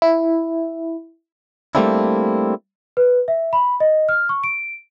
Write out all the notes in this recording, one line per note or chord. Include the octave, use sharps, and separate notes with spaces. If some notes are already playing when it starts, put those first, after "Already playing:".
E4
G3 A3 A#3 C4 D4 E4
B4
E5
B5
D#5
F6
C#6
D7